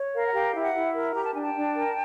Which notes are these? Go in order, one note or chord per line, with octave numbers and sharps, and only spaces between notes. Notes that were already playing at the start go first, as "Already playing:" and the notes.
Already playing: C#5
A#4 F5
F#5
G4 F5 G5
E4
E5 F#5
E4
A#4
G4 A#5
A5
D4 G#5
G5 A5
D4
A#4